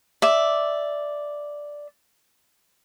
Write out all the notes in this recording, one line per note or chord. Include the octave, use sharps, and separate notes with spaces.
D5 E5